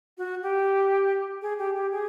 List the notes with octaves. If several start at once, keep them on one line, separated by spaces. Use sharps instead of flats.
F#4
G4
G#4
G4
G4
G#4